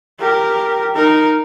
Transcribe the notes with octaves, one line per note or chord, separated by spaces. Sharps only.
G4 A#4
D#4 A#4